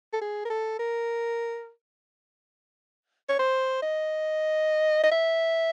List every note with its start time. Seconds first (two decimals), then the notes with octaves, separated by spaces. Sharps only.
0.13 A4
0.22 G#4
0.45 A#4
0.50 A4
0.79 A#4
3.29 C#5
3.39 C5
3.82 D#5
5.03 D#5
5.12 E5